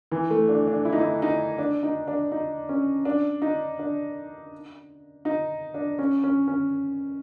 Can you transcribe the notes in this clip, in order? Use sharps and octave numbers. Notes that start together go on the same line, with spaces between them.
E3
A3
D4
D4
E4
D#4
E4
D#4
D4
D#4
D4
D#4
C#4
D4
D#4
D4
D#4
D4
C#4
C#4
C#4